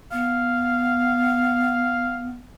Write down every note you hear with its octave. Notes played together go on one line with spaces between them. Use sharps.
B3 F5